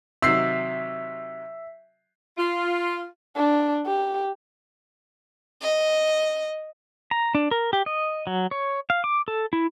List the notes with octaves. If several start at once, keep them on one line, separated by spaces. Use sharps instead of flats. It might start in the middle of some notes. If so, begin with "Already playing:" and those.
C3 D#3 F#3 E5 E6 C7
F4
D4
G4
D#5
A#5
D4
A#4
G4
D#5
F#3
C#5
F5
D6
A4
E4